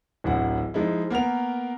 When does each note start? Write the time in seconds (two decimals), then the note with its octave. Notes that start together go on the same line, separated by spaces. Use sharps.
0.24 D1 A1 E4 F#5
0.74 F3 G#3 D#4 E4
1.10 A#3 B3 A#4 F7